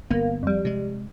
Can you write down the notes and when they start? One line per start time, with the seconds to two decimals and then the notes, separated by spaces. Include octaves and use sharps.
0.11 G1 A#3 B3
0.43 F2 G3
0.65 C3 G#3